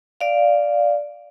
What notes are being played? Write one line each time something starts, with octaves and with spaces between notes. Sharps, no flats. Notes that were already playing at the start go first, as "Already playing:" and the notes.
D5 F5